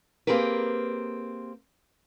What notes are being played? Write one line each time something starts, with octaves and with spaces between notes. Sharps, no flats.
A#3 C4 G4 G#4 A#4 B4